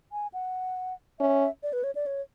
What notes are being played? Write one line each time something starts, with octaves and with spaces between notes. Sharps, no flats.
G#5
F#5
C#4 E5
D5
B4
C#5
D5
C#5